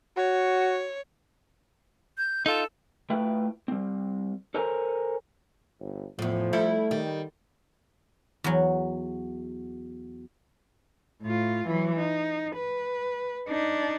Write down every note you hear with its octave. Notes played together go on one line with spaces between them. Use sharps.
F#4 C#5
G6
D#4 F4 A4
A2 A3 F4 B4 E5 G5
G3 C4
A4 A#4 C5 C#5 G#5 A#5
G1
E2 A2 F3
G3 A3 E4 A4
D#3 G3
E2 F#3
A2 F4
E3 F#3
D#4
B4
D4 D#4